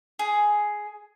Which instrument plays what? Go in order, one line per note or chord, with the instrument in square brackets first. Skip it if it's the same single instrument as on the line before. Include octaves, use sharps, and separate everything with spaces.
[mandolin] G#4